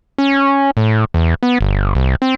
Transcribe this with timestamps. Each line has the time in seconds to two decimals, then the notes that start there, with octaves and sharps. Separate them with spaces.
0.18 C#4
0.77 A2
1.14 E2
1.43 B3
1.61 G1
1.95 C2
2.22 C4